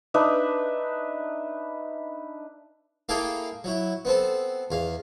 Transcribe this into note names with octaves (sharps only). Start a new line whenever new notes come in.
D4 D#4 B4 E5
A#3 E4 G#4 A4 F5 G5
F#3 E4
B3 C4 A4
E2 F5